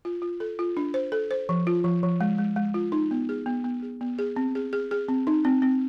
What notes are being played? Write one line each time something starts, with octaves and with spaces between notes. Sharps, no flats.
F4
F4
A4
F4
D4
C5
A4
C5
F3
F4
F3
F3
G#3
G#3
G#3
F4
D#4
B3
G#4
B3
B3
G#4
B3
G#4
C4
G#4
G#4
G#4
C4
D#4
C4
C4